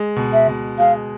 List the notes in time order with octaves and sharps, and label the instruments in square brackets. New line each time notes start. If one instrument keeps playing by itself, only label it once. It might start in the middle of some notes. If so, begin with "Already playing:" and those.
Already playing: [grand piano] G#3
B2
[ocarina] E5
[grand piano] B2
[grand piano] G#3 [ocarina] F5